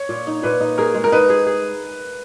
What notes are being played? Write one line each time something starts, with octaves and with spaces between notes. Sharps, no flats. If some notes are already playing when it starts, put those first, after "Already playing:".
Already playing: C#5
A#2
D#4
A#2 B4
D#4
G#4 A#4
G#3
A#4
D#4 B4
G#4
G#4